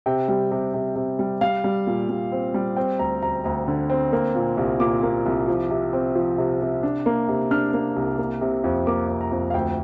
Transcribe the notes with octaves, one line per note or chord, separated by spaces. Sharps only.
C3 G5
G3
C3
C3
C3
G3
G3 F5
G3
A#2
G3
C4
G3
C4 G5
D2 A#5
D2 A#5
D2 A#5
D3
C4
A#3
A#2
C2
A#2 D6
A#3
C2
F3
C3
C4
F3
C3
C3
D4
A#3
C3
D4 F6
A#3
C2
A#3
C3
F2
A#3 D6
F2
A#5
F2
F5
D2 G5